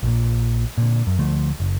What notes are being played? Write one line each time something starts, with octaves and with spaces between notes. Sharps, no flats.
A#1 A#2
A#2 D3
F#2
D2 D3 F3 A3
F#1